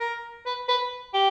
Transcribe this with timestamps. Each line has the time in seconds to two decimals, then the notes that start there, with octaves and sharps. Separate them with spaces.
0.01 A#4
0.46 B4
0.69 B4
1.14 G4